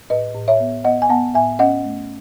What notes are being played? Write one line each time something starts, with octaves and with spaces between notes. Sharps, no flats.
A2 B4 D#5
A2
C#5 E5
B3
B3 D#5 F#5
G#5
B3 F#5 A5
A2 E5 G#5
C#4 D#5 F#5
A3